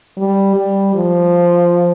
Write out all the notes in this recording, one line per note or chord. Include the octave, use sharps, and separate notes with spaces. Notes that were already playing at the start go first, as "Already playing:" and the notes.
G3
G3
F3